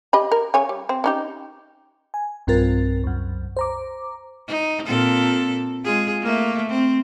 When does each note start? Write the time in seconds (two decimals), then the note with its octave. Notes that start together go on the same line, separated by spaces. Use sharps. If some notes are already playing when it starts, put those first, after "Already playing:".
0.13 G4 D#5 B5
0.32 A#4
0.54 C#3 C#5 G#5
0.69 G3
0.89 C4
1.04 C#4 D#4 G4
2.14 G#5
2.47 B1 G2 C4 F4 A#4 A6
3.04 C2 F#2
3.57 C5 A#5 D6
4.48 D#4
4.86 A#2 C4 A4
5.84 G#3 F4 G#4
6.21 A3 A#3
6.70 C4